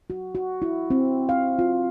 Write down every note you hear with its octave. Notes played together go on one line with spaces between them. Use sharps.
F#4
F#4
E4
C4
F5
F4